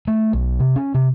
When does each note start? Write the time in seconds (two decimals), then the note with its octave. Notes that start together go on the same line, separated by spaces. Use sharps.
0.07 A3
0.33 B1
0.59 C3
0.76 C#4
0.94 C3